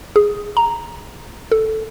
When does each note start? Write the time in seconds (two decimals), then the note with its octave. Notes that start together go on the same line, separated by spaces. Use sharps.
0.16 G#4
0.57 A#5
1.52 A4